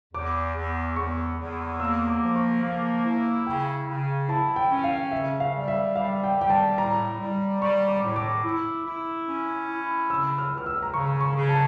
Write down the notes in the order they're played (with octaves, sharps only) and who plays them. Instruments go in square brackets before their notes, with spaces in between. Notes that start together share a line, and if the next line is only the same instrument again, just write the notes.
[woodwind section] E2 [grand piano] D6
[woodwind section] E2
[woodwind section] E2 [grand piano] C#6
[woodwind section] E2
[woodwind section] A#3 [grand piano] E6
[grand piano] D6
[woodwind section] F3
[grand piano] C#6
[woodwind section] A#3 [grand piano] D6
[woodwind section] E4
[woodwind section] C#3 [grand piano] G5
[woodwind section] C#3
[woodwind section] E4 [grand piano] A5
[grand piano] G5
[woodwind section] C#4
[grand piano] F5
[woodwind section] C#3 [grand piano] E5
[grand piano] F5
[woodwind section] G3
[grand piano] E5
[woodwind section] G3 [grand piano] F5
[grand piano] G5
[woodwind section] G3 [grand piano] G5
[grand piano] A5
[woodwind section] A2 [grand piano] A#5
[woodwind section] G3
[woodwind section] G3 [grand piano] C#6
[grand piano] D6
[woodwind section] A2
[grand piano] D6
[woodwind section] E4
E4
C#4
E4
[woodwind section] C#3 [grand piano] E6
[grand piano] F6
[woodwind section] C#2
[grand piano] F6
E6
A#5
[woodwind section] C#3 [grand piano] C#6
[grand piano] C#6
[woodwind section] C#3
[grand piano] A5